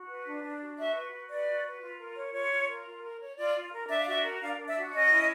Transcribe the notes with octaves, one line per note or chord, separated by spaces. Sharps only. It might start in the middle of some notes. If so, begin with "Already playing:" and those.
Already playing: F#4
B4
D4
D4
F#4
F#4 E5
B4
F#4
B4 D5
F#4
B4
F4
A#4
C#5
F4 C#5
F4
A#4
F4
A#4
C#5
F4 D5
F4
A#4
D4 E5
F5
F#4 E5
A#4
D4 F5
D4
E5
F#4
C#4 D#5
E4